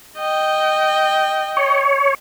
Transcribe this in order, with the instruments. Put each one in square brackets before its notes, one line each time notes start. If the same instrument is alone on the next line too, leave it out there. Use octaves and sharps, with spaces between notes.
[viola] D#5 G5
[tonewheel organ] C#5